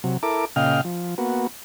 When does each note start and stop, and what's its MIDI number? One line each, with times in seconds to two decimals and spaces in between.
0.04 0.17 48
0.04 0.17 54
0.23 0.45 64
0.23 0.45 69
0.23 0.45 70
0.23 0.45 86
0.56 0.81 46
0.56 0.81 49
0.56 0.81 75
0.56 0.81 77
0.56 0.81 79
0.56 0.81 89
0.85 1.15 53
1.18 1.47 58
1.18 1.47 59
1.18 1.47 66